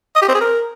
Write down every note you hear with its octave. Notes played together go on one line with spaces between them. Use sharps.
D#5
G4
C4
G#4
A#4